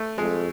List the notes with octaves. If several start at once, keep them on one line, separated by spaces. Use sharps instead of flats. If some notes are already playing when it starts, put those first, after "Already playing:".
Already playing: A3
F2 G#3